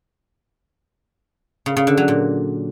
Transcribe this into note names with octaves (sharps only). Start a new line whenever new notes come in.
C#3
C#3
D3
F#3
A#2